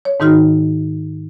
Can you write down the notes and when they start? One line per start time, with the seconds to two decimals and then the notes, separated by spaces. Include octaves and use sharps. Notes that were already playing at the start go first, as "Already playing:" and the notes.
0.05 C#5
0.20 G#2 D#3 D#4 F#4 F6